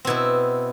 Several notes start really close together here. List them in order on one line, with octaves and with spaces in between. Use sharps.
C4 B2 E4